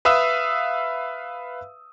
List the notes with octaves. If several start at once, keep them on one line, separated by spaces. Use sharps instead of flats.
B4 E5 F5 D#6 E6